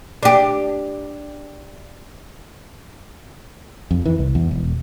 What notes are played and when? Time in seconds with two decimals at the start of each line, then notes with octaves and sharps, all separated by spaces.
0.23 D4 G4
3.91 F2
4.06 E3
4.19 C2
4.35 E2
4.51 E1